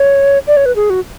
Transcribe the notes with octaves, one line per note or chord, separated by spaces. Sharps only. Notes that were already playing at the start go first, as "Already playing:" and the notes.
Already playing: C#5
D5
C#5
B4
G#4
F#4